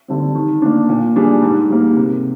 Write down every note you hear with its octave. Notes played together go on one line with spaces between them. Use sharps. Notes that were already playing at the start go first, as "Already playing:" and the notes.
D3 G3 C4
D#3
A#3 D4
A#2
G3 D4 G#4
G#2
G3 A#3
C3